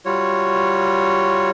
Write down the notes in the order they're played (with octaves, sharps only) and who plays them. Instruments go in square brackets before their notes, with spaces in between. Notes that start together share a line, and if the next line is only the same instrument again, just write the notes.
[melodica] G3 F4 F#4 C#5